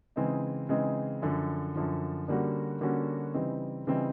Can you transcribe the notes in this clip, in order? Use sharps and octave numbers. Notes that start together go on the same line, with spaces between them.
C#3 E3 G#3 C4 D#4
C#3 E3 G#3 C4 D#4
F#2 D3 F3
F#2 D3 F3
D3 G3 A#3 C#4 F#4
D3 G3 A#3 C#4 F#4
C#3 E3 G3 C4 D#4
C#3 E3 G3 C4 D#4